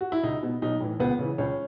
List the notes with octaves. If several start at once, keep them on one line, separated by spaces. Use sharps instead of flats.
F#4
E4
C#2 D#4
B2
B1 D#4
A2 E3
C#2 B3
C#3 E3
C#2 C#4